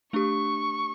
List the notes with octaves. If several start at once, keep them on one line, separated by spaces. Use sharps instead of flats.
A3 D4 G4 C#6